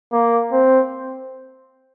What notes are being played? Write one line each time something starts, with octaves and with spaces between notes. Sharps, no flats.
A#3
C4